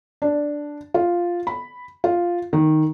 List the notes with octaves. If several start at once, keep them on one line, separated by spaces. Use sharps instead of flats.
D4
F4
B5
F4
D#3